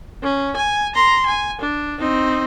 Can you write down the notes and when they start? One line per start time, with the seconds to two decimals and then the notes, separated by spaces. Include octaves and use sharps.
0.23 C#4
0.56 G#5
0.95 A#5 C6
1.26 G#5
1.61 D4
1.99 C4 D#4